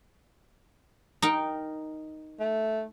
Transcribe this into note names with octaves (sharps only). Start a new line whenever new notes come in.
D#4 A#4 G5
A3